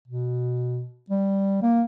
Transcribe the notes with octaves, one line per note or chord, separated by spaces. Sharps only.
B2
G3
A#3